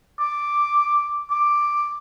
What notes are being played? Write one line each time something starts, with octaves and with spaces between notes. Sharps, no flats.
D6
D6